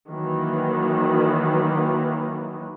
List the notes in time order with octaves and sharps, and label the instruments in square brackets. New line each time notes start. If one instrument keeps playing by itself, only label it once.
[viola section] D#3 E3 F#3 A#3